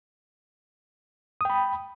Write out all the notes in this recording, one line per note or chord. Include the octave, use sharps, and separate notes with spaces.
G5 B5 D#6